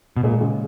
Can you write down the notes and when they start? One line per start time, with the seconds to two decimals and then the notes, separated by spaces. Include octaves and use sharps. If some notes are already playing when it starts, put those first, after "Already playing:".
0.17 B2
0.23 A#2 G#3
0.41 C#3